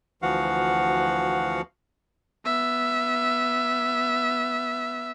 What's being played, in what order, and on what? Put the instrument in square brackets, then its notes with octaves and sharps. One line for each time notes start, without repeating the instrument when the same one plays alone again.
[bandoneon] D2 E3 F3 F#4 F5 F#5
[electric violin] B3 E5